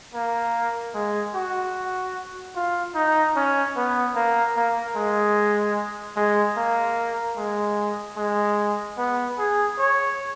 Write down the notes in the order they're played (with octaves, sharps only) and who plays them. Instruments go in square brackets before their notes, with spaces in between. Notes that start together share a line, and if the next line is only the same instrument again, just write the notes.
[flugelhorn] A#3
G#3
F#4
F4
D#4
C#4
B3
A#3
A#3
G#3
G#3
A#3
G#3
G#3
B3
G#4
C#5